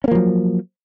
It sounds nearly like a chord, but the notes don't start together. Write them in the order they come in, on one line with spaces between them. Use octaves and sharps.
C#4 A#3 F3 F#3